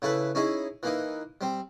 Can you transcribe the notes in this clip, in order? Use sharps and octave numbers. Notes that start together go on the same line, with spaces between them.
C#3 E4 A4 B4
C#4 D#4 E4 G#4
E3 A#3 D#4
G3 C4